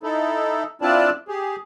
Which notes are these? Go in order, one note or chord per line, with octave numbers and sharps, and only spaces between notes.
D#4 E4 A4
C4 D4 E4 F4 D5 A5
G4 G#4